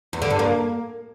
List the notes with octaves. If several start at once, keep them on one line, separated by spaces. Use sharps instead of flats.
E2
D3
G2
A#3